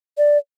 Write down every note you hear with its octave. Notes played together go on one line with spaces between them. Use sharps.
D5